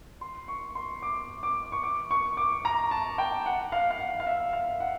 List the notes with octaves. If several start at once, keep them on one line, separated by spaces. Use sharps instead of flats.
C6
C#6
C6
D6
D6
C#6
D6
C#6
D6
A#5
A5
G5
F#5
F5
F5
F#5
F5
E5
F5
F#5